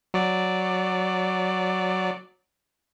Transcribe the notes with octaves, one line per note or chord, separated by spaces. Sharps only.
F#3 D5